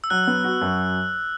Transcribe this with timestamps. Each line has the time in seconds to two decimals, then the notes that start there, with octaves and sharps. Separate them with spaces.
0.04 E6
0.10 F#3 F#6
0.27 B3
0.44 F#4
0.61 F#2